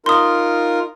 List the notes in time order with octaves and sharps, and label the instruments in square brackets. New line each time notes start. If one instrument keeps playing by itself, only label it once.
[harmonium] D#4 F4 A#4 [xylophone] C6 D#6